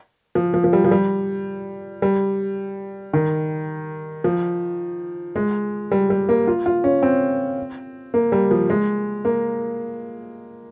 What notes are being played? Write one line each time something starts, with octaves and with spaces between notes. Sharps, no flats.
F3
F3
F3
G3
F3
G3
G3
D#3
F3
G#3
G3
G3
A#3
F4
F4
C#4
C4
A#3
G3
F3
G#3
A#3